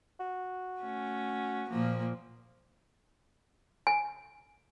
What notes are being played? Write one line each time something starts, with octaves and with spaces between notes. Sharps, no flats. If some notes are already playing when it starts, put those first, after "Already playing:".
F#4
A3 C#4
A#2 F3 A#3
G#5